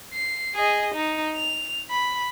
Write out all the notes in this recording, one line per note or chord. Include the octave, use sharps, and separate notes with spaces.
C7
G#4 D#5
D#4
F7
B5